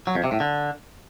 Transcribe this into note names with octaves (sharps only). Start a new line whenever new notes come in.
F#3
F2
C3
A2
D3